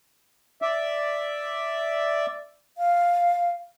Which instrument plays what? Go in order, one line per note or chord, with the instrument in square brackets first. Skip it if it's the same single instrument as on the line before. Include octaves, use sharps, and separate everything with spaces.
[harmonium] D5 E5
[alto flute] F5